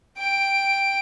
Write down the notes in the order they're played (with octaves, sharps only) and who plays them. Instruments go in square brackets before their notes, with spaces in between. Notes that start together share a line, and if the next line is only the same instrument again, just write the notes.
[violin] G5 D7